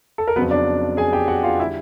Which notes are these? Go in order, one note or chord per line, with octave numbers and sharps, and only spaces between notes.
A4
A#4
F2 C#3 F#3 B3 B4
D4 D5
G#4 G#5
G4 G5
F#4 F#5
F4 F5
D3 G3 E4 E5